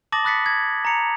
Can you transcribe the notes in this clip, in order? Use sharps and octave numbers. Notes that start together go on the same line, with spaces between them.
A5 D6 D#6 A6 A#6 F#7
B5 D#6 F#6 A6 B6 C#7
G#6
A#5 C#7 F7